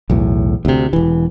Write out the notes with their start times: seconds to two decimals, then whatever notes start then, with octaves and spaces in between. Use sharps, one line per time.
0.10 B1 E2 A2
0.65 D2 C3
0.93 E1 E3